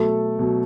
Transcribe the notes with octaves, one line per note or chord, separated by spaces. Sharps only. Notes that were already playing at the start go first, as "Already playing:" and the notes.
Already playing: B2 F#3 A3 A4
B2 F#3